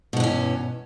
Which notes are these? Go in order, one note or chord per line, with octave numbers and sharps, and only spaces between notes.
G2 B2 E3 C#4